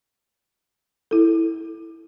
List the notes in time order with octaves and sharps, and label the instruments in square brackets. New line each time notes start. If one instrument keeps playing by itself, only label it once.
[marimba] E4 A4